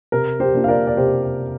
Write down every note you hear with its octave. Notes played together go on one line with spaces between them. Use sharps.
C3 A#4
G4 C5
A#3 D4 F4
F5
A#4 D5
D5
C3 G4 C5